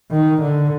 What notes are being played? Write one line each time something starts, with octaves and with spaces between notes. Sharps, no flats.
D#3
D3